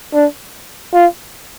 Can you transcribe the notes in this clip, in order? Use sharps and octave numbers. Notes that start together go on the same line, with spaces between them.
D4
F4